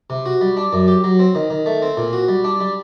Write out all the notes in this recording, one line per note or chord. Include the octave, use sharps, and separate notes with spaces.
C3
F#4
G3
D4
F#2
G4
F#3
C4
D#3
D#3
A3
C4
A#2
F#4
G3
D4
G3